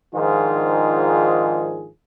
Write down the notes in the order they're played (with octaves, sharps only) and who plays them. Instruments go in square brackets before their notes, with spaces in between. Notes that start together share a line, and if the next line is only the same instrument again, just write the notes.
[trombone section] G#2 D#3 F3 D4 F4 G#4